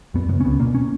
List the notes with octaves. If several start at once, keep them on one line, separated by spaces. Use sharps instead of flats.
F#2 B3
C#3 B3
C#4
C#2 B3
B2 A#3
C#4